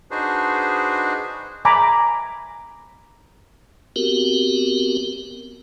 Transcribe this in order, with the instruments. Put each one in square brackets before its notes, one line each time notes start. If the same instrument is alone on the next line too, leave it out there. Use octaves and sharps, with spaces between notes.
[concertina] D4 D#4 F#4 G#4 B4 C5
[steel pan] G#5 A#5 B5 D6
[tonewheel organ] B3 C4 F#4 G4 A#4